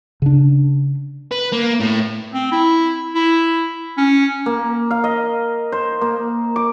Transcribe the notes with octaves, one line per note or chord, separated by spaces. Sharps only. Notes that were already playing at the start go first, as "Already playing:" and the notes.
C#3 D4
B4
A#3
A2
C4
E4
E4
C#4
A#3
F5
D#5
C5
A#3
D6